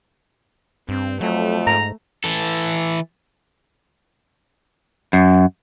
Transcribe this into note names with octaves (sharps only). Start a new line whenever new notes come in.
G2 C4
F2 F#3 A3
G#2 A#5
E3 A4
F#2